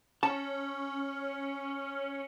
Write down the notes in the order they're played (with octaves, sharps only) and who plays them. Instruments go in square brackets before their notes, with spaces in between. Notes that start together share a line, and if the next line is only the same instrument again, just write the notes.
[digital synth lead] C#4 [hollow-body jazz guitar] A5